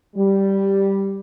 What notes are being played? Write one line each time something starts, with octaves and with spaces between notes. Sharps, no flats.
G3